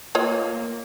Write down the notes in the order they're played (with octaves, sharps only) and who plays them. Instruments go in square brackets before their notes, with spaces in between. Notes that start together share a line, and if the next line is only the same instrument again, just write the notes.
[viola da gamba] A#3 [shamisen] F4 C#5 D#5